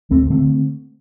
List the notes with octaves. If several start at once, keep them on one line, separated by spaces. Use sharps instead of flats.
D2 A3 C4
D3 A3 C4